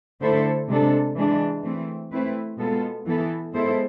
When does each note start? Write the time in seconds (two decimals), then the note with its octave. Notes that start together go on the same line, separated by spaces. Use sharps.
0.21 D3 A3 E4 A4 C5
0.69 C3 G#3 D4 A4
1.16 E3 G#3 D4
1.64 E3 A3 C4
2.12 A3 C4 E4 B4
2.58 B2 G#3 B3 F4 A4
3.06 E3 B3 E4 A4
3.53 G#3 B3 E4 A4 C5